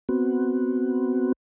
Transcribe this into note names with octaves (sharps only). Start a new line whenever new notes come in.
B3 C4 F#4